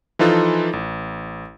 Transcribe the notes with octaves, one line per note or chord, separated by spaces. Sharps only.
E3 F3 D#4 F4 A4 F#6
A1